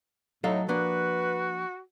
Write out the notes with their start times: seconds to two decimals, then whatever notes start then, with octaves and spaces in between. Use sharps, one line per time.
0.44 A2 F#3 D#4 A4 F5
0.69 F3 A#3 D4 F#4 B4